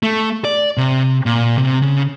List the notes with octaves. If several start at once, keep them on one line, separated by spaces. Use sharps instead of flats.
A3
D5
C3
A#2
C3
C#3